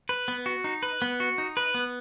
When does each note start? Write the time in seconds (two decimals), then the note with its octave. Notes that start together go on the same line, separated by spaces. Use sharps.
0.09 B4
0.28 B3
0.46 F#4
0.64 D#4
0.83 B4
1.02 B3
1.20 F#4
1.38 D#4
1.57 B4
1.75 B3